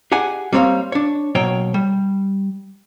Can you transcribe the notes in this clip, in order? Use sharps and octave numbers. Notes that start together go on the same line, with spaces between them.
G4 G#4 F#5 G#5
G3 A#3 C4 C#5 F5
D4 C#5
B2 F#3 A#3 C#5 G5
G3